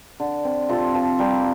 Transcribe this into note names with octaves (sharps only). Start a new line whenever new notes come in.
D3
C4
C3 F4 A4
F3
G3 G4 A#4